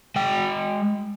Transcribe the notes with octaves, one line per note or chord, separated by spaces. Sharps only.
G#3 G5